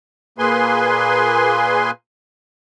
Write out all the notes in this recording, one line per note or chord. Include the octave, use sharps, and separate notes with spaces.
A#2 A#3 G#4 B4 G#5 C6